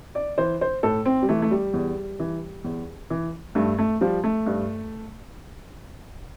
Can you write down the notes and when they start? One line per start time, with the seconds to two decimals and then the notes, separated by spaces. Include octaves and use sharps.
0.15 D5
0.38 E3 C5
0.61 C5
0.83 A2 A4
1.06 C4
1.22 G3
1.29 E3 A3
1.42 A3
1.51 G3
1.74 E2
2.20 E3
2.64 E2
3.10 E3
3.55 G2 A3
3.78 A3
4.01 F3 G3
4.24 A3
4.46 G2